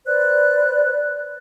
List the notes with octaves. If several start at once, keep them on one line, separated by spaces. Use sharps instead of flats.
B4 C5 D5 F#6